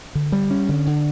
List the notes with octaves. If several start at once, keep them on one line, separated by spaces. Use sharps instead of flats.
D3
G3
C#4
D3
D3